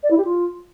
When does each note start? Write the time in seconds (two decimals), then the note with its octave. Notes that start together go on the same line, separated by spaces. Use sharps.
0.03 D5
0.10 E4
0.18 G4
0.25 F4